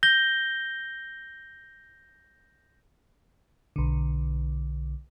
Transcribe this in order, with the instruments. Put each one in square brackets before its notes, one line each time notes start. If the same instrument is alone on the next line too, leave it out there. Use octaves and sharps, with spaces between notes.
[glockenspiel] G6 A#6 G7
[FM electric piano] B1 D3